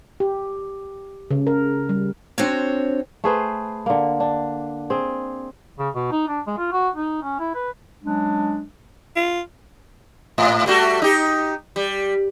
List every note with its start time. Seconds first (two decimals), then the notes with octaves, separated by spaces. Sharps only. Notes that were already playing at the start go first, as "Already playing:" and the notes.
0.20 G4
1.31 C#3
1.47 A#4
1.89 G3
2.38 C4 D4 F#4 C5 C#5
3.24 A3 G#4 B4 C5
3.86 D3 A#3
4.20 D4
4.90 C4 G#4
5.79 C#3
5.95 B2
6.12 D#4
6.28 D4
6.47 G#3
6.58 F4
6.72 F#4
6.96 D#4
7.23 C#4
7.39 E4
7.54 B4
8.03 F#3 G#3 C#4 D4
9.16 F4
10.38 G#2
10.66 G3 A3 F#4
11.02 D#4 G4
11.76 G3